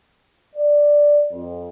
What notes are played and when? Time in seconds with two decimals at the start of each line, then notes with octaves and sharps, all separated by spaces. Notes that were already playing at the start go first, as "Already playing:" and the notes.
0.56 D5
1.32 F2